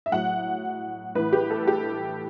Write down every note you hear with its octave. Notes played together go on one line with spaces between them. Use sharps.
E5
A2 F#3 F#5
A2 E3 B4
G4
A4
G4